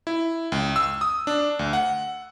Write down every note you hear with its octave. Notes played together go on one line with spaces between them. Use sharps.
E4
C#2
E6
D#6
D4
D2
F#5